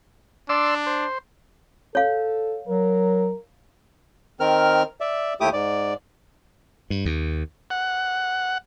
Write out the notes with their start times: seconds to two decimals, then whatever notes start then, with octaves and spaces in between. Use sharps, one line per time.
0.49 D4 D5 C6 E6
0.86 C5
1.95 A4 C#5 F5
2.68 F#3 A#4
4.40 D#3 C4 A#4 F6
5.01 D5 E5
5.41 D#2 A3 E4 G4 D6 D#6
5.53 G#2 D5
6.90 G2
7.05 D#2
7.70 F#5